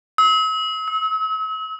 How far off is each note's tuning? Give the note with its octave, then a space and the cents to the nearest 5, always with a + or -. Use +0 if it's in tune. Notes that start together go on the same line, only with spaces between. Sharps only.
E6 -45
E6 -30